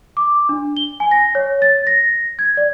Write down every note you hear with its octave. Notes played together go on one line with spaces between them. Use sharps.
D6
D4
G7
G#5
A#6
C#5
A6
A#6
G#6
D5